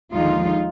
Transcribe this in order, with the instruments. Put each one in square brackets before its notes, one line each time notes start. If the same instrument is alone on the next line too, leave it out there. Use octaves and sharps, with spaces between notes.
[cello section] D#2 D3 F3 G#3 D#4 F4